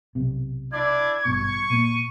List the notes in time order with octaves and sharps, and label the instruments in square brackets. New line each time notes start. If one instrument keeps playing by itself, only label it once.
[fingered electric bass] B1 C3
[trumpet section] D4 E4 D5 [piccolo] G#6
[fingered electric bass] G#1 G2 B2 [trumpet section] C#6
[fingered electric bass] A#2 A#3 [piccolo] D#7